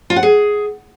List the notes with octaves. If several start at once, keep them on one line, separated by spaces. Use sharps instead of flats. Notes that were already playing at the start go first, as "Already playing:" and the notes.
F4
F#5
G#4